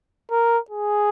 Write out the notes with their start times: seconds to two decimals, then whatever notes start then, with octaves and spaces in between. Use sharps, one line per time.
0.31 A#4
0.70 G#4